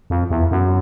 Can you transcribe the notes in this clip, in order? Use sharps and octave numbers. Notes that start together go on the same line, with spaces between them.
F2
E2
F#2